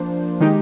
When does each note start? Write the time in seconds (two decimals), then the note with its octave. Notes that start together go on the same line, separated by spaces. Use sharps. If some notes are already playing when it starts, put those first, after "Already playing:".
Already playing: F3 A#3 D4 C5
0.40 D#3 G#3 D#4 G4